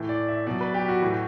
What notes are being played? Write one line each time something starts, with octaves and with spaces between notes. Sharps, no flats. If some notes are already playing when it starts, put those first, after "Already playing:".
Already playing: A2 E3
D5
E5
B2 F#3 D5
B4
G4
F#4
A2 E3